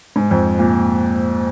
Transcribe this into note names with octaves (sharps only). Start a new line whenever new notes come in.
G#2
F2
A#2